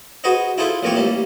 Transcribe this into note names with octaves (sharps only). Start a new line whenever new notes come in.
F#4 G#4 B4 C5 D#5
E4 F4 G#4 A4 C5 E5
A1 F3 A#3 C4 C#5 C#6
A1 G3 A#3 A4